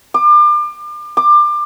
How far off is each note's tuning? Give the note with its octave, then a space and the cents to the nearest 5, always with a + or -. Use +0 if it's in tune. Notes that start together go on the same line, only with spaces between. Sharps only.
D6 +35
D6 +25